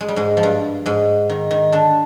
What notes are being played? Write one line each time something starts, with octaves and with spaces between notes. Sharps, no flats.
G#3
G3
G#2 G#3
F3
G2 G3
G#2 G#3
D#3
D#3
D3 D4